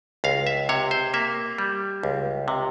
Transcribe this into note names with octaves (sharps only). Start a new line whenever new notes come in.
C#2 F5
E5
C3 C#5
C5
A#3 E5
G3
C#2
C3